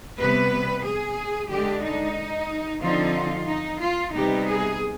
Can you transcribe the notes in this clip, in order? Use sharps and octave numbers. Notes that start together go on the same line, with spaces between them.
C3 G3 B3 B4
G#4
D3 G#3 D4 G4
D#4
D3 F3 C4 D#4 F4
D#4
F4
C3 G3 B3 D#4 G4
G#4